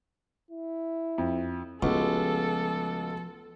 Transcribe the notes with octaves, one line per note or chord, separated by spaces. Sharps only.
E4
F2
C#2 F3 G#3 A3 B3 F#4 A4